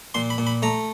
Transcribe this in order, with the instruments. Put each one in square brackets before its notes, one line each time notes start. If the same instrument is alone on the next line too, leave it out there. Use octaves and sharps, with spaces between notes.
[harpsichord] A#2 C6
B5
A#2
B5
A3 A#5